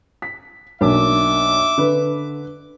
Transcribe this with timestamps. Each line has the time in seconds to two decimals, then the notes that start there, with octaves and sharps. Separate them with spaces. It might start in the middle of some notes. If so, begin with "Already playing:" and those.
0.22 B6
0.81 B1 A#3 D4 E5 D6
1.78 D3 B4